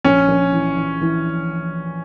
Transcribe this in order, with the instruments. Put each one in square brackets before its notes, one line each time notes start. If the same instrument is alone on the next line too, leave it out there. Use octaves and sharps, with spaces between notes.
[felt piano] A#1 [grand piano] C#4
[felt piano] A#1
E3
E3
E3